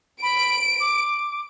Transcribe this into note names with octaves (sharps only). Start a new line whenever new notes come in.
B5 D7
D6